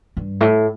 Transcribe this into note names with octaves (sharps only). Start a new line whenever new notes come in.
G2
A2